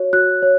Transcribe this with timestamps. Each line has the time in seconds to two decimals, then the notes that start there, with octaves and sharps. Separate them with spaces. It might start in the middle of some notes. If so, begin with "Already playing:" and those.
Already playing: F#4 C#5
0.13 F#4 F#6
0.43 C#5